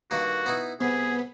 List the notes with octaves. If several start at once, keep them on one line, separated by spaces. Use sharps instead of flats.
G2 D#3 A#3 F#4
B3 D#4 E4
C2 B3 G#4 B6